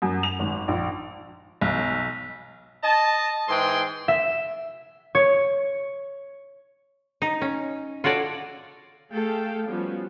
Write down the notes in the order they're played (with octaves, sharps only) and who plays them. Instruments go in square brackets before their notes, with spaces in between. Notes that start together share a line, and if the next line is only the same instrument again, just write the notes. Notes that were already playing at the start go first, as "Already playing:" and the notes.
[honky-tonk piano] F#2
F7
G#1
A#1
B1
[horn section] D#5 A5
G#2 E3 G#4 G5 C6
[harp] E5
C#5
[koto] D#4
C#4
F4 F#4 A4 C#5 D5
[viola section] A3 G#4 A4 F5 G5
F3 G3 B3 C#4 F4 F#4